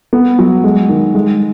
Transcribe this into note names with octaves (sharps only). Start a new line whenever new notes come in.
B3
F#3
G#3
D#3
G#3